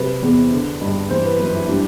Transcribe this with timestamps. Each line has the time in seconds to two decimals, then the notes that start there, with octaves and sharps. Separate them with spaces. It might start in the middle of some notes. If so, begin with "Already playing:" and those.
Already playing: C3 F#3 B4
0.23 E2
0.52 D3
0.81 G2
1.10 E3 C5
1.25 B4
1.40 F#2 B4
1.55 E4
1.69 G3 D4